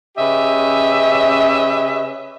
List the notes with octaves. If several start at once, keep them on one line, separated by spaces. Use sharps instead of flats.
C#3 C#4 G4 B4 D#5 E5